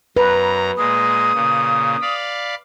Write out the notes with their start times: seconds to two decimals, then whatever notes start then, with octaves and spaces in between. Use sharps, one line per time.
0.17 F#2 B4 A#5
0.78 A#2 G#3 D#6
1.34 A#2 C#3
2.01 D5 F5 B5